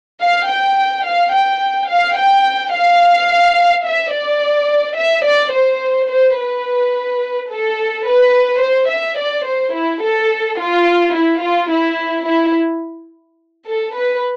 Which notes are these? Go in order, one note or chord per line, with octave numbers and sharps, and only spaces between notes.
F5
G5
F5
G5
F5
G5
F5
E5
D5
E5
D5
C5
C5
B4
A4
B4
C5
E5
D5
C5
E4
A4
F4
E4
F4
E4
E4
A4
B4